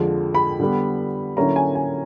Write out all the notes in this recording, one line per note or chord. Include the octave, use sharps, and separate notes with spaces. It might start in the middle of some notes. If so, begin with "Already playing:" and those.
Already playing: F2 D3 F3 G#3
B5
D3 G3 B3
D3 F#3 A#3 C#4 E4 A#5
G#5
G#5